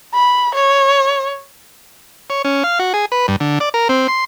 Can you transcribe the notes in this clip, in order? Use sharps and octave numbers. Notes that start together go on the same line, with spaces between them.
B5
C#5
C#5
C#4
F5
F#4
G#4
B4
G2
D3
D5
A#4
C4
C6